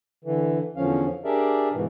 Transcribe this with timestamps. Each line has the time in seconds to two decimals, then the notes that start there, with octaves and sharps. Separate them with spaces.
0.25 D3 E3
0.76 E2 D3 F3 C#4 F5
1.25 D4 G4 G#4 A#4 D5 E5
1.72 G#2 B2 E3